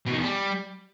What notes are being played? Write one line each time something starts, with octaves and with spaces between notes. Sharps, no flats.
B2
D#3
E2
G3